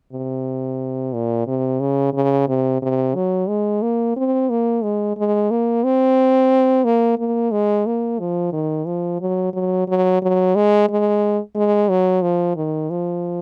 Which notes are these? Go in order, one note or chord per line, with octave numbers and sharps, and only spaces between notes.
C3
A#2
C3
C#3
C#3
C3
C3
F#3
G#3
A#3
C4
A#3
G#3
G#3
A#3
C4
A#3
A#3
G#3
A#3
F3
D#3
F3
F#3
F#3
F#3
F#3
G#3
G#3
G#3
F#3
F3
D#3
F3